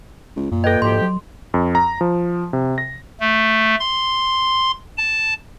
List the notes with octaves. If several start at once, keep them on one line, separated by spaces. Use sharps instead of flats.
C#2
F#2 A#2
A4 B4 D#5 G5
D2 G#2 F3 G4 C6
F#3
F2
A#5
F3
C3
A#6
A3
C6
A5